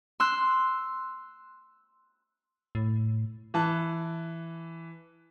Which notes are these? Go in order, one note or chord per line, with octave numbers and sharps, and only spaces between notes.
C6 E6 F#6
A2
E3 A5 F#6